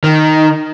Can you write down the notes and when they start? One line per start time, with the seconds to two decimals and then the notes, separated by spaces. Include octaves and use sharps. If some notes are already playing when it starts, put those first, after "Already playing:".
0.04 D#3